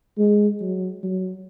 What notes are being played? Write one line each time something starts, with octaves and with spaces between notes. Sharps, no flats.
G#3
F#3
F#3